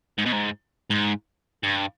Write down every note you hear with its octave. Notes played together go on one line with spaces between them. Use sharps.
G#2
B2
G#2
G#2
G2